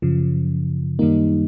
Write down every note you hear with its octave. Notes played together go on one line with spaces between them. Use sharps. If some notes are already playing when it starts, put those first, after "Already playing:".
F#2 C#3 F3
F#2 D#3 G3 A#3 D#4